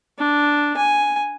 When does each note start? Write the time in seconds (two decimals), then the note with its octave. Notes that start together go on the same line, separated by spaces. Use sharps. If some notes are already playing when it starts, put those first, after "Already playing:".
0.18 D4
0.77 G#5